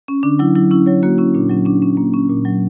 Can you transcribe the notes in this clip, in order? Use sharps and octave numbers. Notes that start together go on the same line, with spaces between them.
C#4
D3 D4
F#3 E4
F#3 E4
C#4 E4
F#3 C#5
A#3 F#4
C#4 E4
A#2 D4
F#3 C#4
C#4 D4
C#4
A#3
C#4
A#2
F#3